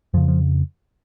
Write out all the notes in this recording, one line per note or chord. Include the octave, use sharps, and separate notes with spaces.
F2 C#3 F3
F3